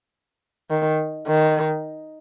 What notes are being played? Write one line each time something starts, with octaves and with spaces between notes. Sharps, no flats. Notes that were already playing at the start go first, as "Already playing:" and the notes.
D#3
D#3